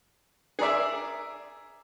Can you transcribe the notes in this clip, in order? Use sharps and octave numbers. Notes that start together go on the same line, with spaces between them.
G#4 A#4 D5 E5